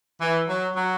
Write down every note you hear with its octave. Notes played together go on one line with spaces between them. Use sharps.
E3
F#3
F#3